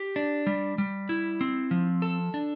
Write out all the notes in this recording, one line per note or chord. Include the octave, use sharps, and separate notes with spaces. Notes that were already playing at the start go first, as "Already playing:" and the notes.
Already playing: G4
D4
G3
G3
E4
C4
F3
A4
D4